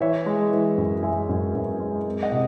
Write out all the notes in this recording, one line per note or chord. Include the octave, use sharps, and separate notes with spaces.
E3 C#5 E5
G#3
E3
F#2
G#3 E5 G#5
F#2
F#2
G#3
C4
D#5 F#5
C3